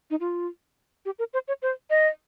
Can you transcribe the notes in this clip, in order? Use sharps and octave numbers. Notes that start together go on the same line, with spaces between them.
D#4
F4
G4
A#4
C5
C#5
C5
D#5